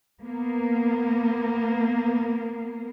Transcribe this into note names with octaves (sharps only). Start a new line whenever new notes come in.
A#3 B3